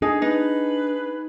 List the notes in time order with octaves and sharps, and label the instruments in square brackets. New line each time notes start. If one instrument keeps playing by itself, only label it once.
[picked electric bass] D4 [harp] D#4 [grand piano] G#4
[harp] D#4 [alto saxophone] B4